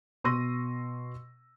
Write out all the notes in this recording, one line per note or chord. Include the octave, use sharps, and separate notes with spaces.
B2 C6 C#6 E6 A#6 D#7